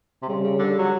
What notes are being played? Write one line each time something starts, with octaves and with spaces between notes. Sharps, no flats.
C3
C#3 G3
C#3
D3
F#3